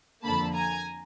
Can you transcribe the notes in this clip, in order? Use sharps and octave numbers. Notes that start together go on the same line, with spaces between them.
F2 D3 F3 A#3 A5 B5
G#5 A#5